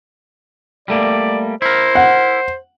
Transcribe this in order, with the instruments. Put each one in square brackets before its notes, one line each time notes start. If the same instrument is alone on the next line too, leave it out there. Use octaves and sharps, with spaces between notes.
[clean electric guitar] G3 A3 A#3 [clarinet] D5
[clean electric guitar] E4 A#4 [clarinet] C5
[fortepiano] F#5